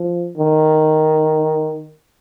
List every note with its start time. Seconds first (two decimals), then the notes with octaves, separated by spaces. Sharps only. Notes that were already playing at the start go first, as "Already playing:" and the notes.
Already playing: F3
0.38 D#3